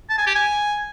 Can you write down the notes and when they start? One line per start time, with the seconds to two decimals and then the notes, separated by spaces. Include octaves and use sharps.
0.10 A5
0.18 G#5
0.27 G4
0.35 G#5